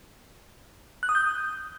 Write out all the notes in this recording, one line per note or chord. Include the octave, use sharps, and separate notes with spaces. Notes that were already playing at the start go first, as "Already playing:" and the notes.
F#6
D#6
G6